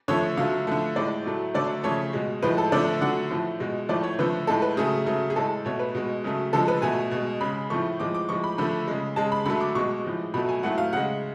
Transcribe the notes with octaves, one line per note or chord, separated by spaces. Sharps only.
D3 F3 A3 C#5
D3 F#3 A3 F5
D3 F3 A3
A2 G#3 D5
A2 F#3 A3
D3 F#3 A3 D5
C#3 F3 A3 C#5
B2 G#3
A2 F3 G#3 B4
A4
D3 F3 A3 D5
D3 F#3 A3 F#5
A2 F3 A3
B2 G#3
A2 F3 A3 D5
C#5
D3 F3 A3 B4
A2 G#3 A4
B4
C#3 F#3 A3 G#4
C#3 F#3 A3
G#4
A2 G#3 A4
B2 A3 C#5
B4
B2 G#3
C#3 F#3 A3
D3 F3 G#3 A4
B4
B2 A3 G#5
B2 G#3
C#3 G#3 B5
A2 F3 A3 C#6
A2 F3 G#3 D6
D6
A2 F3 G#3 C#6
B5
D3 F3 A3 B5
C#3 G#3
C#3 G#3 A5
B5
D3 F#3 A3 B5
D6
B2 G#3 C#6
A2 F3 G#3
B2 F#3 A3 B5
G#5
A2 F#3 A3 F#5
F5
C#3 G#3 F#5